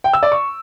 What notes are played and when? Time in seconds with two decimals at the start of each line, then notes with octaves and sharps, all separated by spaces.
0.04 G5
0.13 E6
0.23 D5
0.32 C#6